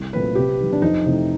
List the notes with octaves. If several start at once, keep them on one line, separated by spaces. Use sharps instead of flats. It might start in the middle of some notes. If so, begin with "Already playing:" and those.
Already playing: C2
A#2 F#3 A3 C4 B4
C3 G4
D#3 F#3
D4
F2 D#4
C3 E3 A3